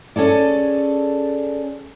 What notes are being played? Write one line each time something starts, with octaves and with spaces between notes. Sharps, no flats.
C#4 G#4 A4 D5